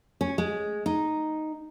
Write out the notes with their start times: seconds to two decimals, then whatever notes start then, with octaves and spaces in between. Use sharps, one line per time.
0.21 C#4
0.38 G#3
0.86 D#4